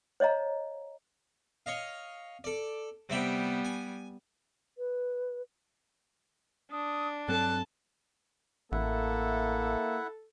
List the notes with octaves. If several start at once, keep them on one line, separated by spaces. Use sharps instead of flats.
C5 C#5 D#5 F5 A#5
C#5 D#5 F5
A4 D5
C3 G3 B3 E5 G5
G#5
B4
D4 D#6
G2 F#3 C4 A4 A5 F#6
A1 A#3 E4 A4 E5 F#5